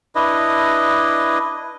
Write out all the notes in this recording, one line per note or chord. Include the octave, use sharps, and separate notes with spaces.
D4 E4 B4 D#5